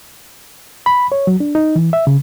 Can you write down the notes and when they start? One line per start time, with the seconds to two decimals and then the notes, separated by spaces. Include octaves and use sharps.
0.86 B5
1.12 C#5
1.27 F#3
1.40 D4
1.55 D#4
1.76 E3
1.93 E5
2.07 C#3